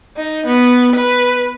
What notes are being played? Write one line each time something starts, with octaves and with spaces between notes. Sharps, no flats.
D#4
B3
B4